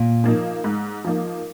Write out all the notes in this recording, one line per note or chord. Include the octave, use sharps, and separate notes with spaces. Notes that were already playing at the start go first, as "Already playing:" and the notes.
Already playing: A#2
F3 A#3 D#4
G#2
F3 A#3 D#4